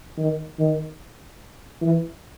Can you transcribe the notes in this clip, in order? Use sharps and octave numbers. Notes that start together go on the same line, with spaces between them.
D#3
D#3
E3